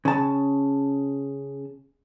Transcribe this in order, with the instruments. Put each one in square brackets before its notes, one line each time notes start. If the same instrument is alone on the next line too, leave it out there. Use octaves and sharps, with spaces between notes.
[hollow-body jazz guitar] C#3 A5